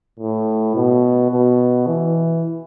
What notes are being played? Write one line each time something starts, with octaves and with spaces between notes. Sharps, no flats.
A2
B2
B2
E3